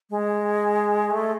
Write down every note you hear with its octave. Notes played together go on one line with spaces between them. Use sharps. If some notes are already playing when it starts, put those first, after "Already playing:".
G#3
A3